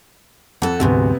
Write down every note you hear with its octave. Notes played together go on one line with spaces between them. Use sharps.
F2 A4 F#5
D2 G#2 C3 F#3 B3